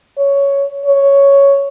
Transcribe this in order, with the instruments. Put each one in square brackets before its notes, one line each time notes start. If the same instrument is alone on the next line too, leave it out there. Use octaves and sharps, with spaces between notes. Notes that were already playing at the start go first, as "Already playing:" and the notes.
[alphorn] C#5
C#5